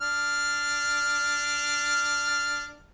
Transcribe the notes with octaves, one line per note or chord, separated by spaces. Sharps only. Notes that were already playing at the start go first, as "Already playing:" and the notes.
D4 F6